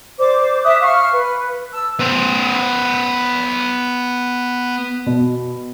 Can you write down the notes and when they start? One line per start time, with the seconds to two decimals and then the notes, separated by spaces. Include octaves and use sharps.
0.19 C5 D5 D6
0.63 E5 D6 D#6 F#6
0.82 F5 C#6 F6
1.12 B4
1.73 A5 E6
1.99 B3 C5
5.06 B2